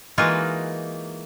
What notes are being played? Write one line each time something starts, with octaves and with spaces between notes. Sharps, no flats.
E3 G#3 A#3 D#4 F4 F#4